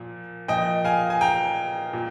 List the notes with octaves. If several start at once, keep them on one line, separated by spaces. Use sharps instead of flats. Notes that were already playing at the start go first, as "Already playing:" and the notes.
Already playing: A#2 F3
A#2 F3 D#5 G5
F5 G#5
G#5
G5 A#5
A#2